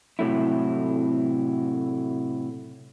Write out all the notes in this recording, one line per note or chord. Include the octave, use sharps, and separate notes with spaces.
A2 C3 F#3 A3 E4